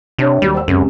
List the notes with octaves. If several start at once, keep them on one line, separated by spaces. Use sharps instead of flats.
C3 D4 C#5
D#2 F#3 G3
C5 E6
C#2 F#2 C3